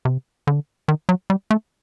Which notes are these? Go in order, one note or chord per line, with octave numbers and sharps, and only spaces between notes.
C3
D3
D#3
F#3
G3
A3